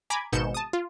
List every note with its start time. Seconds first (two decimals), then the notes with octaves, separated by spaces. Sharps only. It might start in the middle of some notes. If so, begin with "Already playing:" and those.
0.10 G#5 A#5 B5 D6 G#6
0.32 G#1 G#2 B2 G6 C#7 E7
0.54 A5 D#6
0.73 F4